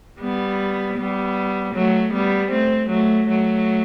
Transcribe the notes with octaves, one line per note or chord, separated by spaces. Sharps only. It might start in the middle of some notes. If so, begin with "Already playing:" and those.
G3 B3
G3 B3
F#3 A3
G3 B3
A3 C4
F#3 A3
F#3 A3